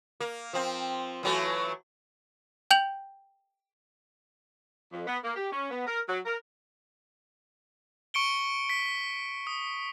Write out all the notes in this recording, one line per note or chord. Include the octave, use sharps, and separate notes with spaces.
A#3
F3 C4
E3 F#3 A3
G5 G6 F7 F#7
F2
B3
A#3
G4
C#4
B3
A#4
F#3
A#4
C#6 C#7 D7 G7
B6
D#6